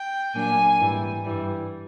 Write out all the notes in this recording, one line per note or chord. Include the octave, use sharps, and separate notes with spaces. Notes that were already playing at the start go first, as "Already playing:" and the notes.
Already playing: G5
A#2 F#3 A#3 D4 G#5
G#2 E3 G3
G2 E3 G3